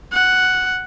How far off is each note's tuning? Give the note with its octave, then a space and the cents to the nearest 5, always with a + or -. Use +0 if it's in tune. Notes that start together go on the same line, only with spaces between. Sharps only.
F#5 +0